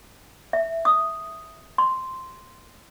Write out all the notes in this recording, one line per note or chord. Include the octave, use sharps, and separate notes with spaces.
E5
D#6
C6